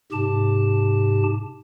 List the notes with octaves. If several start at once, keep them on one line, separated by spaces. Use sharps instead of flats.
G#2 C3 G4 A5